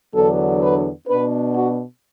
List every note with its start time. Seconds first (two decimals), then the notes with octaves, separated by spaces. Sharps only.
0.14 E2 D3 F#3 B3 D4 A4
0.62 B4
1.07 B2 B3 D4 B4
1.55 F#4